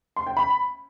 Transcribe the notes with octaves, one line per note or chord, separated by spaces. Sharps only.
C6
G5
B5